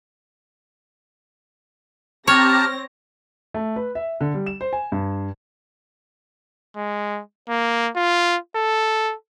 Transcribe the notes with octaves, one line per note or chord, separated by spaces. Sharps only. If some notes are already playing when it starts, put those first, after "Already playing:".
C4 G4 C#5 A5 A#5 F6 A#6
A3
B4
E5
D3
G3
E7
C5
G#5
G2
G#3
A#3
F4
A4